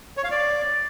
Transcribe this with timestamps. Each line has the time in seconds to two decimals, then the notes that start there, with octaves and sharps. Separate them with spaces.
0.17 C#5
0.24 F5
0.31 D5